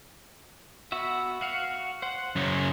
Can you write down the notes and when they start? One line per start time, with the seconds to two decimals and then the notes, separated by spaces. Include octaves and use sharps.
0.92 B3 F#4 E5
1.41 F#4 F5 F#5
2.02 C5 F#5
2.36 F#2 C#3